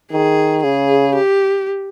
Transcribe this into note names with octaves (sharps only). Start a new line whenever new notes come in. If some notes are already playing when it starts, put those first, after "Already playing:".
D#3 G#4
C#3 G#4
G4